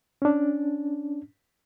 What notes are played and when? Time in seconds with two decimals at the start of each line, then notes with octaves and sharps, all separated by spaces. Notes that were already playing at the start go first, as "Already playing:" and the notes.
0.22 C#4 D4